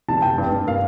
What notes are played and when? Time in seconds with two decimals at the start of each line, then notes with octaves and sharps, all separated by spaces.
0.08 F1 A5
0.22 F1 G5
0.38 G2
0.52 G2
0.67 A#3 F5